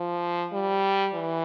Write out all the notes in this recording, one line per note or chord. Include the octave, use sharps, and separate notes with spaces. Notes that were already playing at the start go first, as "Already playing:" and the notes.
Already playing: F3
G3
E3